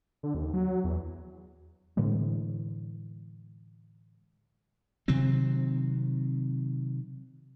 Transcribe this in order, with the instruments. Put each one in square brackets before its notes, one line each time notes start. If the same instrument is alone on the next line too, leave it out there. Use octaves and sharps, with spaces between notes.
[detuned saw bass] D3
D#2
F#3
E2
[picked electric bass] A2 D3 E3 G#3
[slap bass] C3 D#3 F#3 C4